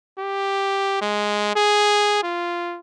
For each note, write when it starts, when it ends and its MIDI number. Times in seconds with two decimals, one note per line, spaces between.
0.18 0.98 67
1.01 1.54 56
1.56 2.22 68
2.23 2.79 65